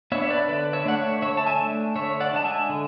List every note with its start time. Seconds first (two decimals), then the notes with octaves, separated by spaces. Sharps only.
0.12 B3 D4 C#5 E5
0.24 E5
0.30 B4 D5
0.48 D3 B4 D5
0.73 C#5 E5
0.86 A3 D4 F#5
0.97 C#5 E5
1.22 D3 C#5 E5
1.37 A5
1.47 E5 G#5
1.59 A3 D4
1.96 D3 C#5 E5
2.20 D5 F#5
2.33 G#3 D4 A5
2.45 E5 G#5
2.69 D3